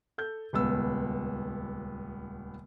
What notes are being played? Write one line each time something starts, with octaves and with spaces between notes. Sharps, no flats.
A4 G6
D#1 C#2 B3 E6